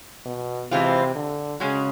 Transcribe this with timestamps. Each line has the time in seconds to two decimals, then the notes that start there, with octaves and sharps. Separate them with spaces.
0.26 B2
0.71 C3 E3 G#3 C4 F4
1.16 D3
1.60 C#3 G#3 C#4 F#4